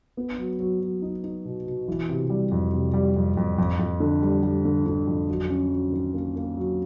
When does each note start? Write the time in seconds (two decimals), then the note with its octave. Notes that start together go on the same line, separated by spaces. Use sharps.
0.17 B3
0.38 F#3
0.60 F#3
0.81 F#3
1.02 D#4
1.24 D#4
1.45 B2
1.67 B2
1.88 E3
2.09 C3
2.30 G3
2.51 F2
2.73 C3
2.94 G3
3.16 F2
3.37 F2
3.58 F2
3.79 F2
4.00 D3
4.22 G3
4.43 G3
4.65 D3
4.87 D3
5.07 F2
5.28 F#3
5.50 C#4
5.71 F#3
5.92 D#3
6.13 A#3
6.36 A#3
6.57 F#3